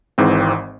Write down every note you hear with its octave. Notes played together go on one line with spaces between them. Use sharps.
G#1 G#2 E3 G#3 C4